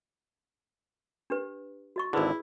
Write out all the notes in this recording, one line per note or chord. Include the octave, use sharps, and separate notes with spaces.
D4 G4 B4
F#4 D#5 C#6
G#1 D3 E4 G#4 B4 E6